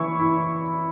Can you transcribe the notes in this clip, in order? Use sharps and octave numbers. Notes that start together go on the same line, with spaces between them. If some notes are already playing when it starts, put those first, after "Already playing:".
Already playing: E3 E4 C#6
E4